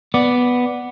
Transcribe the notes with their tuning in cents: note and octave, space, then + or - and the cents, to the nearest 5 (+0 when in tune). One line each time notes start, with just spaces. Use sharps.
B3 +0 D5 +0